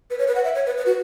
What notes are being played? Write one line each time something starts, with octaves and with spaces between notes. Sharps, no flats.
B4
C#5
B4
F#5
E5
C#5
B4
B4
F#4